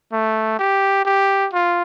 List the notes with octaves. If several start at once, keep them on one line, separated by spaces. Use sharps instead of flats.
A3
G4
G4
F4